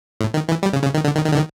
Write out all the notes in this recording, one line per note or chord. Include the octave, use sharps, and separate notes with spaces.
A2
D#3
E3
G3
C#3
C#3
D#3
D3
D#3
D#3
D3
D#3